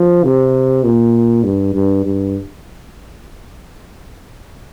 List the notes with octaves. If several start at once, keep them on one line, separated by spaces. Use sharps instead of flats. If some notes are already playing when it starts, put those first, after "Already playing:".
Already playing: F3
C3
A#2
G2
G2
G2